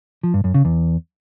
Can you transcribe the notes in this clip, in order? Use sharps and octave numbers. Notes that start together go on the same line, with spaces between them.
F3
G2
F#2
C#3
E2